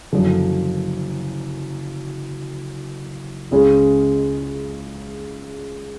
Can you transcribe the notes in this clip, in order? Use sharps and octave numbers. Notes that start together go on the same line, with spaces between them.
F#1 F#2 D3 F3
C#2 C#3 G#3 C#4